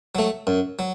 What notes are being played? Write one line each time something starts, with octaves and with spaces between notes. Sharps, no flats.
F#3 A3
F#2
F#3